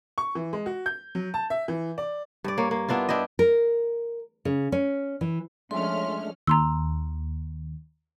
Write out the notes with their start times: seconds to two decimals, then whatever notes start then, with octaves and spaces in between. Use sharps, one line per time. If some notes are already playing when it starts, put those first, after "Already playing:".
0.18 C#6
0.35 E3
0.53 G#3
0.66 F#4
0.86 G6
1.15 F#3
1.34 A5
1.50 E5
1.68 E3
1.98 D5
2.44 G2 D5
2.58 A#3 C#5
2.71 A#3
2.89 B3 D4 E4 F4
3.09 D4 E4 G4 D#5
3.39 A#4
4.45 C#3
4.72 C#4
5.21 E3
5.71 F3 G#3 A3 C#4 D4 E5 C6 F6
6.47 D#2 A#5 C6 E6